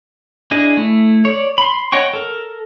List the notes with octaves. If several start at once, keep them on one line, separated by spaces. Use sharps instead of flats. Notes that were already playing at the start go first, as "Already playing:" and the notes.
D4 E4 G#4 D#5
A3 E4
C#5 D5
B5 C6
C#5 D#5 F#5 G5 C#6
A4 A#4